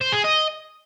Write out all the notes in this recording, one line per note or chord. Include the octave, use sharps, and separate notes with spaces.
C5
G#4
D#5